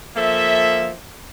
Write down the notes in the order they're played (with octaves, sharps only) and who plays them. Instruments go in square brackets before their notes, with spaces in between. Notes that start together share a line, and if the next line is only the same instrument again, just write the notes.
[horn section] F3 A#3 A4 E5